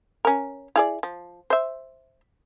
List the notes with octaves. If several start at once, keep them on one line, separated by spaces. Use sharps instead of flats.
C#4 A#4
E4 G#4 D5
F3
C5 E5